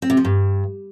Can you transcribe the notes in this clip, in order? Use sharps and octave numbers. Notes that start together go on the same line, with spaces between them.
C4
C3
F3
G2